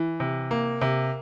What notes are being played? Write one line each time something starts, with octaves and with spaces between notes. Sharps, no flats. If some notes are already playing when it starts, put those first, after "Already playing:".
Already playing: E3
C3
A#3
C3